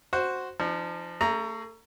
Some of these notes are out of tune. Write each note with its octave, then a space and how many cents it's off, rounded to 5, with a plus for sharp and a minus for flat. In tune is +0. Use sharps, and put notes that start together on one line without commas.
F#4 +0 C5 +0
F3 -20 D4 +45
A3 +30 G#4 +0 A#5 +0